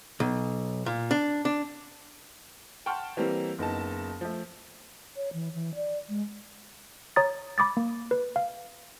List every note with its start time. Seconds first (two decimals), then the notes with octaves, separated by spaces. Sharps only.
0.20 B1
0.86 A#2
1.11 D4
1.45 D4
2.86 F#5 G5 A5 C6 C#6 F6
3.17 E3 G3 A#3 C4
3.59 F#1 B3 D#4 A5
4.21 F3 A3
5.16 C#5
5.33 E3
5.54 E3
5.75 D5
6.09 G#3
7.16 C#5 A#5 D#6 A6
7.58 B5 D6 D#6 A6
7.77 A#3
8.11 B4
8.36 F5